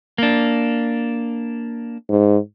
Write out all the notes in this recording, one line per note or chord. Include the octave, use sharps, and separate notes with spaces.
A#3 D4
G#2